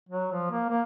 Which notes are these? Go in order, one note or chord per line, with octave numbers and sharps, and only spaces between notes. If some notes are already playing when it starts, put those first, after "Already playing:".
F#3
F3
A#3
A#3